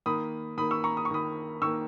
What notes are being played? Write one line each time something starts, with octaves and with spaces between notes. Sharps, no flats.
D#3 A#3 B5 D#6
D#3 A#3 B5 D#6
C#6 E6
A#5 C#6
D#6
C#6
D#3 A#3 B5 D#6
D#3 A#3 C#6 E6